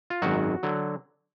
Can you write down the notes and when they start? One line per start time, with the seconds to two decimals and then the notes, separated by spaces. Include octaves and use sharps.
0.10 F4
0.22 G#1 F#2 D#3 F#3 F#4
0.63 D3 F#3